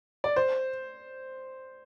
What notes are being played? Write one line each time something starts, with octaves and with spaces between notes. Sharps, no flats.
D5
C5